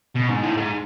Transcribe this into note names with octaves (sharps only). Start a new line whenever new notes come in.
B2
G#2
A2
G#2